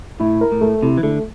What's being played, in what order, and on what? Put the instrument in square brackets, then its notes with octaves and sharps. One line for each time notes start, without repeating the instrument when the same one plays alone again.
[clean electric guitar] A2 [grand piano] E4
[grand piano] A#4
[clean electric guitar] A2
[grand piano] A3
[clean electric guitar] C3 [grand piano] E4
[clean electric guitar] E3
[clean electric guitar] D3 [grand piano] A3